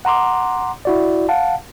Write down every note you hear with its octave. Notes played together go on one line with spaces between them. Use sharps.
F#5 A#5 C6 D6
E4 F#4 D5
F5 F#5 A5